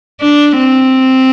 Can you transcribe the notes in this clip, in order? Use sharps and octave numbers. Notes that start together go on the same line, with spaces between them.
D4
C4